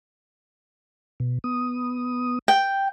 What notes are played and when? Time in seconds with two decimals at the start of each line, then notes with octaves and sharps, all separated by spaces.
1.20 B2
1.44 B3 D#6
2.48 G5